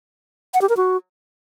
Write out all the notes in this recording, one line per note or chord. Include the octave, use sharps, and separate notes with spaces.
F#5
G4
A#4
F#4